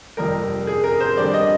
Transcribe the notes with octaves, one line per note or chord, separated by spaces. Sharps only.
G1 F2 C3 G3 A#4
G#4
A#4
C5
F2 D3 G3 D5
D#5